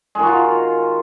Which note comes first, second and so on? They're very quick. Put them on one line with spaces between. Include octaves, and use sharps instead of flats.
G#3 D#3 F#4 F4